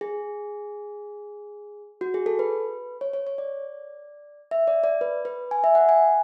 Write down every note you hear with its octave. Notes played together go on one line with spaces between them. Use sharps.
G#4
F#4
G#4
A4
B4
C#5
C#5
C#5
D5
E5
D5
D5
B4
B4
G#5
E5
F#5
G#5